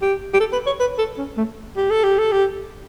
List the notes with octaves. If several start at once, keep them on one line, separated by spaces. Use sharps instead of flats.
G4
G4
A4
B4
C#5
B4
A4
C#4
A3
G4
A4
G4
A4
G4